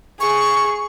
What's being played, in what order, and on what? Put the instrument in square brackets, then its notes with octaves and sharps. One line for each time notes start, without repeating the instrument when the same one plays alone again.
[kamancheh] G#4 [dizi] C#6